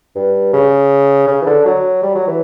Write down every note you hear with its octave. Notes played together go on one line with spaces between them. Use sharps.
G2
C#3
C#3
E3
D3
F#3
G3
F#3
E3